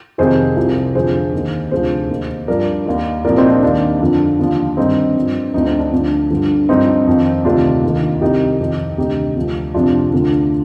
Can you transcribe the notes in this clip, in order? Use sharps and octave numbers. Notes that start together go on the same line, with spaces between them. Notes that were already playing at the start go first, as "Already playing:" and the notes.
F2 C3 D#3 G#4 C5
C2 C3 F3
F2 D3 F3 G#4 C5
D#2 D#3
D2 C3 F3 G#4 C5
D#2 D#3
G2 F3 A#4 D5
D#2 D#3
C2 A#2 F3 A#4 D5
C4 D#4
D4
D#2 D#3 D4
F2 D3 F3
D#2 D3 F3
G2 D#3 C4 D#4
G2 F3
D2 D3 F3 C4 D#4
C4
D4
D2 D3 F3
G2 D3 F3
G2 F3 C4 D#4
F2 D#3
D2 C3 D#3 D4 F4
D#2 D#3
C2 C3 D#3 D#4 G4
F2 D#3
D2 C3 D#3 D#4 G4
D2 D3 F3
F2 C3 F3 D4 F4
D2 D3 F3